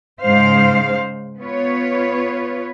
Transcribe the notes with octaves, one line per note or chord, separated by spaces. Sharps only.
G#2 C#3 G#3 C5 F5
B3 F4 B4 C#5